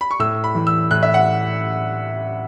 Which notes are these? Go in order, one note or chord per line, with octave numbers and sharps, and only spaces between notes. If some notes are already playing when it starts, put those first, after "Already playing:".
B5
C#6
A2 E6
B5
E3
E6
A2 F#6
E5
F#5